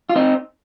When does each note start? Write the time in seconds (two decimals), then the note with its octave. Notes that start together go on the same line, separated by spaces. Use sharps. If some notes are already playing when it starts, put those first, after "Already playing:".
0.09 F4
0.16 C4 D#4